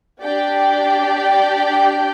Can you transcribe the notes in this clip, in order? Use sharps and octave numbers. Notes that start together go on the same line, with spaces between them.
D4 G4 D5 G5